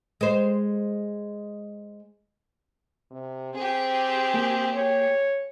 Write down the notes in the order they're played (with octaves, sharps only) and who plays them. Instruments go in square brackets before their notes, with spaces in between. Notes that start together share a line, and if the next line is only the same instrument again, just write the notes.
[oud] G#3 C5
[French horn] C3
[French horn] C4 [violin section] G4 G#4
[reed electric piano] A#3 G5
[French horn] C#5